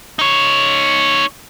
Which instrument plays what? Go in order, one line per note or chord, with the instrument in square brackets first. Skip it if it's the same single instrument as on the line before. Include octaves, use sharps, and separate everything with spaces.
[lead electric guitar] D#4 C#5